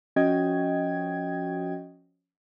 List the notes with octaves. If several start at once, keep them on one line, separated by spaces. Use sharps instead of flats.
F3 C#4 F#4 D#5 G5 G#6